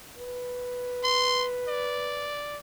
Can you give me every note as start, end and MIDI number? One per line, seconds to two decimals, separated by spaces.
0.18 2.37 71
1.04 1.46 84
1.68 2.59 74